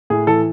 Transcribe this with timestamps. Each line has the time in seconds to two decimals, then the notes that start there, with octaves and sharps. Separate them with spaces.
0.10 A2 G#4
0.27 E3 A4